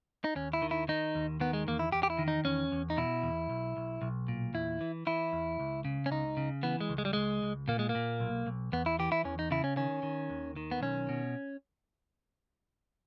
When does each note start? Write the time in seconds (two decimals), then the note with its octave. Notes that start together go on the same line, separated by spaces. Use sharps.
0.24 D#4
0.35 D#2 C#4
0.53 E4
0.62 D#3
0.71 E4
0.88 D#3 D#4
1.15 D#2
1.40 D#3 B3
1.53 G#3
1.67 E2 A#3
1.79 E4
1.92 E2 G4
2.03 G4
2.10 E4
2.19 D#3
2.28 D#4
2.45 E2 C#4
2.72 E2
2.90 D#4
2.97 B2 E4
3.23 E2
3.49 B1
3.77 B1
4.02 B1
4.28 A#2
4.54 E2 E4
4.81 E3
5.07 E3 E4
5.33 E2
5.60 C#2
5.85 C#3
6.06 C#4
6.11 C#2 D#4
6.37 C#3
6.63 E3 B3
6.81 G#3
6.89 C#2
6.98 G#3
7.05 G3
7.13 C#2 G#3
7.42 C#2
7.68 A#2 A#3
7.79 G#3
7.89 A#3
7.95 A#2
8.20 B1
8.47 B1
8.72 E2 B3
8.86 E4
8.99 E3 G4
9.12 E4
9.24 E2 C#4
9.39 D#4
9.51 C#3 E4
9.64 C#4
9.77 D#3 C#4
10.03 D#3
10.30 D#2
10.56 D#3
10.71 B3
10.81 B1 C#4
11.09 B2